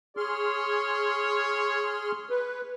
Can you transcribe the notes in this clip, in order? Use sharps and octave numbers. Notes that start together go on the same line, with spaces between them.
G#4 C#5 C6 F6
B4